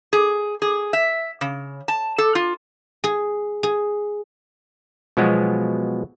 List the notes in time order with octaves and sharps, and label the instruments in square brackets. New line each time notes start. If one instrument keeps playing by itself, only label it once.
[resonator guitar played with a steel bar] G#4
G#4
E5
C#3
A5
A4
F4
[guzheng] G#4
G#4
[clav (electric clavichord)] B2 F3 F#3 G#3 B3